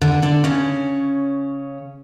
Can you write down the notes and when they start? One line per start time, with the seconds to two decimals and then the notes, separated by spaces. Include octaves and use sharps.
0.01 D3 D4
0.22 D3 D4
0.44 C#3 C#4